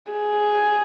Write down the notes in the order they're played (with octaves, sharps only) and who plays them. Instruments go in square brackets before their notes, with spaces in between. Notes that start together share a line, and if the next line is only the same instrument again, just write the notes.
[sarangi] G#4